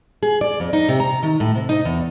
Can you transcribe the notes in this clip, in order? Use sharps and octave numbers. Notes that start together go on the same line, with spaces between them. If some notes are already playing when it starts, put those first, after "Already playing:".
G#4
D5
F2
D#4
C3
A#5
D#3
A2
C3
D#4
E2